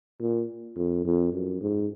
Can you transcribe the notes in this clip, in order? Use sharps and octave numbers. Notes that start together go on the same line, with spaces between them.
A#2
F2
F2
F#2
G#2